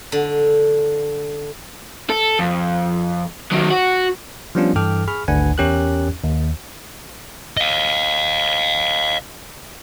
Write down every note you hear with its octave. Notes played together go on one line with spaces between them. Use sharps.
D3
A4
F2
D#3 F#3
F#4
F3 G3 B3 C#4 D4 F4
G2 E3 A4 G5 D6 F6
G#4 B5 C#6 F6
G#1 D2 D4 B4 F#5 G#5
E2 C#4 G4 A#4 F#6
D#2
D#5 F5